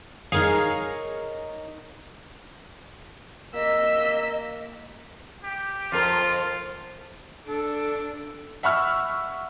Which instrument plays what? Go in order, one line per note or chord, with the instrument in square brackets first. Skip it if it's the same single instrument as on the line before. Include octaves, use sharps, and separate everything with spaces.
[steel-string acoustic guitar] D#4 A#4 C#5 [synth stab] G#4 F5
[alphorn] A#3 [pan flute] D#5 [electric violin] E6 B6
[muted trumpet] G4
[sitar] F2 A#4 [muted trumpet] F4
[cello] D4 [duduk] A4
[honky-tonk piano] E5 F#5 B5 C#6 E6 F6